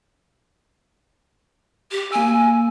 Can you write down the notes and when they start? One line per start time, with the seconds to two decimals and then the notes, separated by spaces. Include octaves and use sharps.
1.91 G4
2.12 A#3 G#5 E6